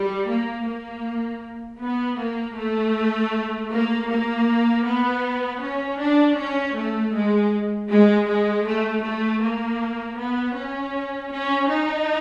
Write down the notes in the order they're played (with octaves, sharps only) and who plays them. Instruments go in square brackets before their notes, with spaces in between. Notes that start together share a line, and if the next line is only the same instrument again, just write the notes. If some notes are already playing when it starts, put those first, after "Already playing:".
Already playing: [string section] G3
A#3
A#3
B3
A#3
A3
A#3
A#3
B3
C#4
D4
C#4
A3
G#3
G#3
G#3
A3
A3
A#3
B3
C#4
C#4
D#4